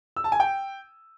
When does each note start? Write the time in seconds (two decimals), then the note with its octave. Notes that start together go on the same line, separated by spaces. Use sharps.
0.16 E6
0.24 A5
0.32 G#5
0.40 G5